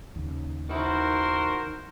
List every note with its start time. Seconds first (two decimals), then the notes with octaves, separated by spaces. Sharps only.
0.16 D#2 C#3
0.69 D#3 E4 F#4 A#4 C5